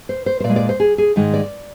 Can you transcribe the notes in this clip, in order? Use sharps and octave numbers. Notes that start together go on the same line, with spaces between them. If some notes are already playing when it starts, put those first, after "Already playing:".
C5
C5
C5
A#2 D5
G#3
D5
C5
G#4
G#4
G#2 D#3 G#3
D5